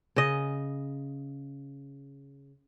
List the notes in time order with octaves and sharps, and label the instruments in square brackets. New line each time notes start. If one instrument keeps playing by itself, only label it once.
[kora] C#3 D#5